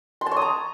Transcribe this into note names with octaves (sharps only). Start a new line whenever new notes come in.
C6
A5
C#5
D#6
A#5